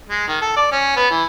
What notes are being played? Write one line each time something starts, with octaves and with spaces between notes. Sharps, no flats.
G#3
D#3
A4
D5
C#4
B3
E3